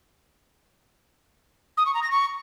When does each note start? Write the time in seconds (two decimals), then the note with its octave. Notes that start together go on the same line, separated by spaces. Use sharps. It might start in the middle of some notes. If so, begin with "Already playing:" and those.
1.77 D#6
1.86 C#6
1.94 A#5
2.03 A#6
2.11 C#6